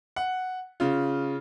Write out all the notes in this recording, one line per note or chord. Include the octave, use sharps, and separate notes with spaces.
F#5
C#3 F4